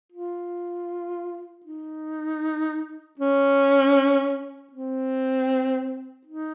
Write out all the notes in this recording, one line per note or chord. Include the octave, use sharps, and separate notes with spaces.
F4
D#4
C#4
C4
D#4